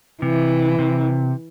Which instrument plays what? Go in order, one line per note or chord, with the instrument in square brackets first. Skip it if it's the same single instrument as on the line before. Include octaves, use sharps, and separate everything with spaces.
[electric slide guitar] C3 [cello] E3
[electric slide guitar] C3